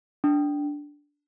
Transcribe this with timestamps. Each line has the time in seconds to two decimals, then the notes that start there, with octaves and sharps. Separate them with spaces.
0.24 D4